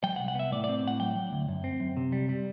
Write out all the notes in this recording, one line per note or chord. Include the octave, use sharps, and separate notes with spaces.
F#3 G5
F#5
C2
F#5
B3 E5
A2 D5
C4 D5
A2 F#5
F#3 G5
F#3
D2
F#2
C4
F#2
C3
G3
G3